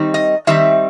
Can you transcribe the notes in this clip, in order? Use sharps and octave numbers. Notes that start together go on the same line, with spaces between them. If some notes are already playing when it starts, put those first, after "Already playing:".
Already playing: D#3 G3 C4 D#4
D#5
D#3 G3 C4 D#4 E5